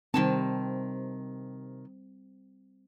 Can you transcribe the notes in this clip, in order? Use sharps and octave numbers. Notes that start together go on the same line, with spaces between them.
C3 D#3 G3 C4 A5